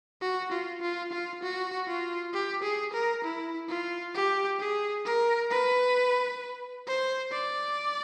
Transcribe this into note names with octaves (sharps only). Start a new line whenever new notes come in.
F#4
F4
F4
F4
F#4
F4
G4
G#4
A#4
E4
F4
G4
G#4
A#4
B4
C5
D5